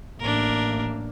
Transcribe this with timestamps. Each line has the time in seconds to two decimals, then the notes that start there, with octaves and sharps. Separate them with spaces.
0.19 A1 A#3 D4 A#4